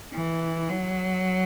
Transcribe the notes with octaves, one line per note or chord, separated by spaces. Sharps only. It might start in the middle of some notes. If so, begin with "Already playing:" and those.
E3
F#3